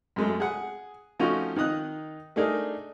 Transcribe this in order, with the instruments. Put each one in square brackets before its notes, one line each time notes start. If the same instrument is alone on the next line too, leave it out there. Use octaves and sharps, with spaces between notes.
[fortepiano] F#2 G#3 A3
G#4 F#5
F3 A3 C#4 D#4 F4 F#4
D#3 D#4 D#6 F#6
A3 D4 D#4 G#4 A#4